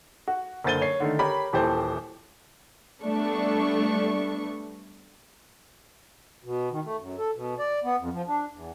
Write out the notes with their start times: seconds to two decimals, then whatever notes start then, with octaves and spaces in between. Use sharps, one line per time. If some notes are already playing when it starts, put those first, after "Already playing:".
0.28 F#4
0.64 F#1 D3 C5 A6 D#7 G7
0.81 C#5 C7
1.00 D3 D#3 A3
1.19 G4 A#4 C#5 B5
1.53 D#1 E3 G4 A4 C5 A5
3.03 G3 A3 B3 D4 C#6
6.44 B2
6.72 D#3
6.84 A3
7.00 F#2
7.18 A4
7.35 B2
7.59 D5
7.84 B3
7.99 F2
8.13 F3
8.28 D4
8.53 E2